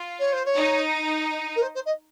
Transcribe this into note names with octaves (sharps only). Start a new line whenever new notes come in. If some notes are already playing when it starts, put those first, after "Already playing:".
Already playing: F4
C#5
C5
C#5
D#4
A#4
C5
C5
D#5